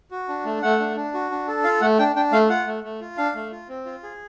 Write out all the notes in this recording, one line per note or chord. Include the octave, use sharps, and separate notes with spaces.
F#4
D4
A3
A3 F#5
D4
D4
F#4
D4
A4
F4 F5
A3 F#5
D4 G5
D4 G5
A3 F5
F4 F#5
A3
A3
F4
D4 F5
A3
F4
C4
F4
G#4